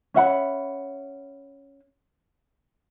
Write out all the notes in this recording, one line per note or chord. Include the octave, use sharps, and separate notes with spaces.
C#4 E5 F#5 B5